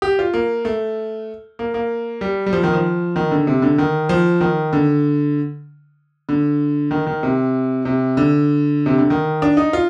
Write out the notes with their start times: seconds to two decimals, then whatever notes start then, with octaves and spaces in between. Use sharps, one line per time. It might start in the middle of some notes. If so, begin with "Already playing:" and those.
0.02 G4
0.19 F4
0.34 A#3
0.65 A3
1.59 A#3
1.74 A#3
2.21 G3
2.46 G3
2.53 F3
2.63 D#3
2.73 F3
3.16 D#3
3.31 D3
3.47 C3
3.62 D3
3.78 D#3
4.09 F3
4.41 D#3
4.73 D3
6.29 D3
6.91 D#3
7.07 D#3
7.23 C3
7.85 C3
8.17 D3
8.86 C3
8.98 D3
9.10 D#3
9.42 D4
9.57 D#4
9.73 F4